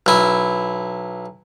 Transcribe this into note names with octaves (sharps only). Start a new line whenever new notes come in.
B1 E4